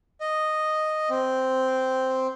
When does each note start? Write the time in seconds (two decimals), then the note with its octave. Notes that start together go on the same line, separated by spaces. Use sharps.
0.20 D#5
1.10 C4